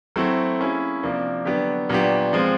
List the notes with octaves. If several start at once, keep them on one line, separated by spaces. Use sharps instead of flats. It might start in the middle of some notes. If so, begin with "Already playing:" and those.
F#3 A3 C4 E4 A4
A#3 C#4 E4 G#4
C3 F3 A#3 D4
D3 F#3 B3 D4 G4
A#2 F#3 B3 D4 G4
F3 G#3 C4 F4